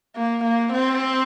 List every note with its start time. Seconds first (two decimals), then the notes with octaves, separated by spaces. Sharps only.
0.16 A#3
0.44 A#3
0.73 C4